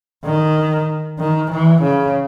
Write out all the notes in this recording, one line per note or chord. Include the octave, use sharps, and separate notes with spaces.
D#3
D#3
E3
C#3